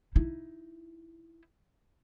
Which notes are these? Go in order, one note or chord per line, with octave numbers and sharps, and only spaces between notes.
D#4 E4